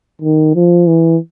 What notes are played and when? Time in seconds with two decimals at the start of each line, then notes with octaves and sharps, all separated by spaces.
0.21 D#3
0.55 F3
0.87 E3